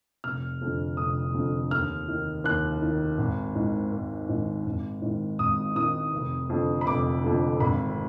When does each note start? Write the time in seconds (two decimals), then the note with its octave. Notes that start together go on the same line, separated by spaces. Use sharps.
0.24 F1 F6
0.61 F2 D3
0.97 F1 D#6
1.34 F2 D3
1.71 D#2 F6
2.09 D#3
2.44 D#2 F#6
2.82 D#3
3.18 G#1
3.55 G#2 D#3
3.92 G#1
4.29 G#2 D#3
4.66 G#1
5.02 G#2 D#3
5.39 G#1 D#6
5.75 G#2 D#3 D#6
6.12 F1
6.49 F2 D3
6.81 B5
6.86 F1 D6
7.23 F2 D3
7.60 G#1 B5